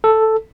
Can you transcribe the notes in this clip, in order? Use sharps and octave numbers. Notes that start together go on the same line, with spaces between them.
A4